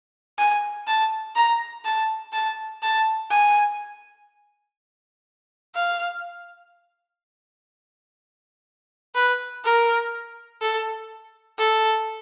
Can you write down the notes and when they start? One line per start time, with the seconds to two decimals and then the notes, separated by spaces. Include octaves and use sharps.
0.38 G#5
0.87 A5
1.35 A#5
1.85 A5
2.33 A5
2.82 A5
3.30 G#5
5.74 F5
9.15 B4
9.64 A#4
10.61 A4
11.58 A4